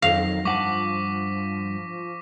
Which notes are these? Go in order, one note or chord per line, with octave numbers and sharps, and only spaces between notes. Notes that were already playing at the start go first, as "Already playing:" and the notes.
F2 D#3 F#3 F5 A#6
G2 F3 F#5 A5 C#6 D6 B6